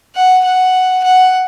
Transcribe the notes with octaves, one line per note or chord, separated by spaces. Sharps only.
F#5
F#5
F#5